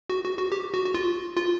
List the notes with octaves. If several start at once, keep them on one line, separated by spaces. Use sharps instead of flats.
F#4
F#4
F#4
G4
F#4
F#4
F4
F4